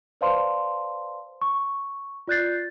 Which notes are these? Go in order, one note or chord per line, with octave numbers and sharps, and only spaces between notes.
B4 C5 D5 F5 A5 C6
C#6
F4 D5 F#6 G6 A6 C7